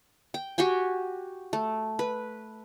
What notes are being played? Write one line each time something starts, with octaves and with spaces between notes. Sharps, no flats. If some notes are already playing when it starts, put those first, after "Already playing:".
G5
F#4 G4 G5 G#5
A3
B4